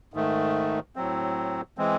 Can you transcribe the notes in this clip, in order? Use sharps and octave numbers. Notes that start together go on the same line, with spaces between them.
G#2 D#3 A3
A2 F#3 C4
E3 G#3 C4